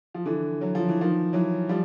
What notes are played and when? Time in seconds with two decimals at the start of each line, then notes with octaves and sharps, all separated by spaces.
0.14 F3
0.25 D3 E3
0.61 F#3
0.75 F3
0.88 E3
1.01 D#3 F3
1.33 E3 F#3
1.69 F3 G3